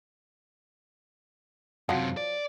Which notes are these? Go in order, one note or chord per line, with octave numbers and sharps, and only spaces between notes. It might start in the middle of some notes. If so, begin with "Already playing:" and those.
F#2 C3 F3 F#3
D5